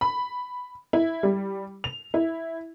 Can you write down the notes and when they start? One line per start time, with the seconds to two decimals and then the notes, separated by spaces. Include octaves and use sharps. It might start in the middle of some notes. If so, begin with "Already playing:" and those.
0.01 B5
0.93 E4
1.23 G3
1.84 F7
2.14 E4